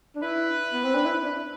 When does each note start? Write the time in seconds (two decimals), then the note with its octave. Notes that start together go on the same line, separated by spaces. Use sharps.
0.16 D4
0.23 E4 B4
0.73 B3
0.84 C4
0.95 D4
1.05 E4
1.25 D4